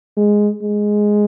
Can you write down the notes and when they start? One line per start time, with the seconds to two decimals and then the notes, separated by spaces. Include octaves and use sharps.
0.17 G#3
0.63 G#3